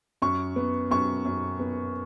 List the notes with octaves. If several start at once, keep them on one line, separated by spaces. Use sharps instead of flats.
F#2 C#6
B3
F#2 C#6
F#2
B3